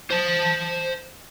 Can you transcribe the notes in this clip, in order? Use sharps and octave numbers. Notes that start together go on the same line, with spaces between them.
C5 A5